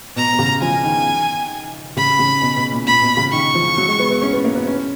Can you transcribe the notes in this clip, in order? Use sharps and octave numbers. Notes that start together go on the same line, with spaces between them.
B2 A#5
B2
C#3
F3 G#5
D#3
C#3 B5
C#3
B2
B2
A#2
A#2 B5
B2
C#3
D#3 C#6
F3
F#3
G#3
B3
B3
C#4
B3
A#3
B3
C#4